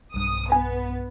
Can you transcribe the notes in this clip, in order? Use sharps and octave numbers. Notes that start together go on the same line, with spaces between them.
B1 G2 D#6
B3 G#5